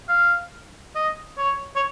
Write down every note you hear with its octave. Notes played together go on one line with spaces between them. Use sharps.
F5
D#5
C#5
C#5